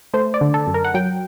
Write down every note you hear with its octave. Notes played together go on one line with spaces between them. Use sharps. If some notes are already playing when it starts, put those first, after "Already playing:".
A3 C5
D5
D3
A4
F#2
A#4
F#5
F#3 G5